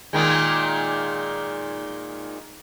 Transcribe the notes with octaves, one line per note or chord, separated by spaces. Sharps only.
A#2 D#3 G#3